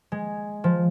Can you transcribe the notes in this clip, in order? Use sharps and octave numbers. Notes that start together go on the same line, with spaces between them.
G#3
F3